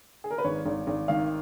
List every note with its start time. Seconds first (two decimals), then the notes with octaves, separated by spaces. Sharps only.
0.24 G#4
0.31 A#4
0.38 B4
0.44 G#1 C#5
0.66 G#1
0.87 G#1
1.08 D#3 F5